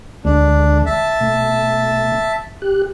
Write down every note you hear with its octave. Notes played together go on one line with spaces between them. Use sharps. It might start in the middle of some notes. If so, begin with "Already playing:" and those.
D2 D3 G#3 D4
E5 A5
B2 A3
G4 F#6